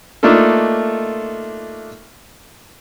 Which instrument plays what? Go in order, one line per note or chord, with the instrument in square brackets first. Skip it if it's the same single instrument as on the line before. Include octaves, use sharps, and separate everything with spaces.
[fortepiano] A3 A#3 D4 D#4 F4 A4